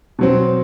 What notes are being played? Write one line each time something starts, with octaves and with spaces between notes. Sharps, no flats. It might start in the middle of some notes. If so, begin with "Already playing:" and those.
B2 F#3 C4